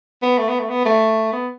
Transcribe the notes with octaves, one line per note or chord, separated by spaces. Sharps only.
B3
A3
B3
A3
B3
A3
B3